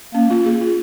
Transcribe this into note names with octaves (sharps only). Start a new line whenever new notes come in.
A#3 C#4
F4
G#4
F4